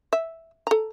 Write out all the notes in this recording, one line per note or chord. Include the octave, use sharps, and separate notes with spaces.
E5
A4 A#5